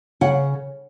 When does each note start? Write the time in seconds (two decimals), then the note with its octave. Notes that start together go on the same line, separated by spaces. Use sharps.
0.21 C#3 F#5